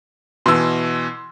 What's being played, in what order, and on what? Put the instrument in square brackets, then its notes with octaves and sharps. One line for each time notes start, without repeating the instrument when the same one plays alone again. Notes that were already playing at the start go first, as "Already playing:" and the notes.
[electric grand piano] B2 E3 [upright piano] C6 E6